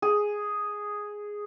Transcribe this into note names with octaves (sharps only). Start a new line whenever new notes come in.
G#4